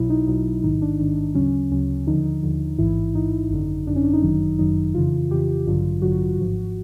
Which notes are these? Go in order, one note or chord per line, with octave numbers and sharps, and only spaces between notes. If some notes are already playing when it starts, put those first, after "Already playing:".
Already playing: B1 B2 F#3 E4
D#4
B1 B2 F#3 D#4
A1 G#2 D#3 D#4
D4
A1 G#2 D#3 D4
D2 C#3 F#3 C#4
D2 C#3 F#3 C#4
D#2 D3 F3 D#4
D#4
D#2 D3 F3
A1 G#2 E3 E4
A1 G#2 E3 D#4
G#1 F#2 D3
G#1 F#2 D3 D4
C#4
D4
D#4
G1 F#2 D#3 F#3
G1 F#2 D#3 F#3 D#4
F2 C#3 E3 F4
F2 C#3 E3 G4
A1 G2 D3 F#3 F4
A1 G2 D3 F#3 F#4
G#1 G#2 F3